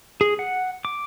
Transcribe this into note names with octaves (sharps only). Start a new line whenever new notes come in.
G#4
F#5
D6